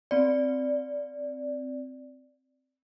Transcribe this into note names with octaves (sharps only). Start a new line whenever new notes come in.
C4 D5